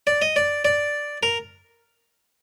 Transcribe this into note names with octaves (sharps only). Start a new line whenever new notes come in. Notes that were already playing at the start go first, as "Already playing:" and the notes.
D5
D#5
D5
D5
A#4